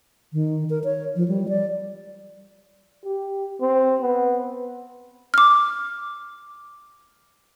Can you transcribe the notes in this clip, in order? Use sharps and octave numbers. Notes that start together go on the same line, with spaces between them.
D#3
A#4
C#5
F3
G3
D5
G4
C4
B3
D6 F6